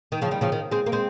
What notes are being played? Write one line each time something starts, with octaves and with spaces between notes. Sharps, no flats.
D#3
C#3 F3
D#3 G3
C#3 F3
D#3
G#3 C4
A#3
G#3 C4